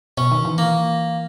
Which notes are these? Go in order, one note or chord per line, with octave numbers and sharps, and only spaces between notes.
B2 C#4
D#3
E3
A#3